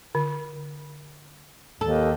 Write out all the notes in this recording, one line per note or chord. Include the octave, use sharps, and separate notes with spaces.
D3
D#2 A4